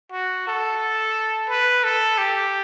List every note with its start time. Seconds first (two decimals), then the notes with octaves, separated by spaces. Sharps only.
0.12 F#4
0.47 A4
1.50 B4
1.84 A4
2.18 G4